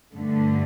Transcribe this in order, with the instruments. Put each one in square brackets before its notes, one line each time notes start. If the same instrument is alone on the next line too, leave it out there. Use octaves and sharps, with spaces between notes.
[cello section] G2 D3 A3